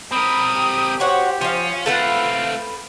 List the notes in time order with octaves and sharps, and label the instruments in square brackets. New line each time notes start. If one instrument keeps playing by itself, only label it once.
[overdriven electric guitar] C4 A#4 [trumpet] B5 [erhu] D#6
[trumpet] G4
[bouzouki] F#4 C#5 F#5 [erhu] C5
[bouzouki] F3 C5 F5 [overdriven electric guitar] C#4 [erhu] F4
[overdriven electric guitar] A3 C4 [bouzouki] A4 B4 F#5 [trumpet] F5